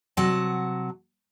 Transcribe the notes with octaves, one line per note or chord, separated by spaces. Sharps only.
C3 F#3 F#5 A5